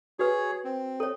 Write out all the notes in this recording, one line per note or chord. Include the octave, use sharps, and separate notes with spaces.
F#4 G#4 B4 C#5
C4
A4 C#5